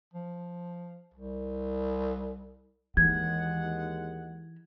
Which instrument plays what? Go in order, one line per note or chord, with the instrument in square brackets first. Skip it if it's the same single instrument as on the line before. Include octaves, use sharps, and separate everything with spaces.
[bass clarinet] F3
C2
[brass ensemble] D#2 G#3 F#5 [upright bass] E3 [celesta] G#6